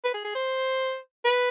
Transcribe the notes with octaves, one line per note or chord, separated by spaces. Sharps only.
B4
G#4
G#4
C5
B4